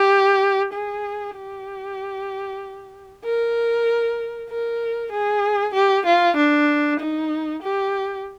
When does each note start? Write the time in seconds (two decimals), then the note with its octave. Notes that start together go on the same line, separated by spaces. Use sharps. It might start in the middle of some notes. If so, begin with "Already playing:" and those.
Already playing: G4
0.74 G#4
1.36 G4
3.24 A#4
4.50 A#4
5.12 G#4
5.74 G4
6.06 F4
6.37 D4
6.99 D#4
7.62 G4